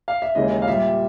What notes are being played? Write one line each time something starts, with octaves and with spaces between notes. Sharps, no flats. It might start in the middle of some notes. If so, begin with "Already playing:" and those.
F5
E5
D#2 C#3 E3 G#3 D#5
F5
A#2 G3 E5